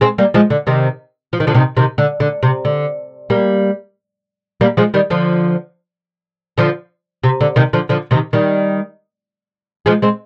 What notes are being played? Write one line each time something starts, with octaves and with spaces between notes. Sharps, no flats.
G#3 C4
G3 A#3
F3 G#3
D3
C3 D#3
F3
D#3
D3 F3
C3 D#3
C3 D#3
D3
D3
C3
D3
G3 A#3
G3 A#3
F3 G#3
D#3 G3
D3 F3
D3 F3
C3
D3
C3 D#3
D3 F3
D3 F3
C3 D#3
D#3 G3
F3 G#3
G#3 C4